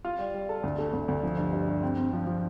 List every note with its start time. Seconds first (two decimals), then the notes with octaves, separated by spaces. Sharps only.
0.05 F4
0.19 G3
0.34 G3
0.49 A4
0.63 D2
0.78 A3
0.93 D2
1.08 D2
1.23 F3
1.38 G2
1.53 G2
1.68 G2
1.83 C4
1.97 C4
2.13 F3
2.27 F3